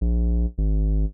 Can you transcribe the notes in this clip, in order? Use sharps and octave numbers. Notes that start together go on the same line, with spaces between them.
A#1
G#1